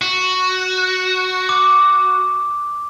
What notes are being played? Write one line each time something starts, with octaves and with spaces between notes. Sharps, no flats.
F#4
D6